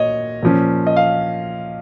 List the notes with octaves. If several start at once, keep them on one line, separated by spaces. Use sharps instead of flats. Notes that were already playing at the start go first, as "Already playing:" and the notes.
Already playing: A#2 C#5 D#5
A#2 F3 C#4
D#5
F5